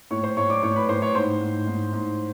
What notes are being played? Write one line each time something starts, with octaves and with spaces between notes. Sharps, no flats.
A2 C#5 C#6
C5 C6
A2 C#5 C#6
D5 D6
A2 C#5 C#6
B4 B5
A2 C5 C6
C#5 C#6
G#2 C5 C6
G#2
G#2
G#2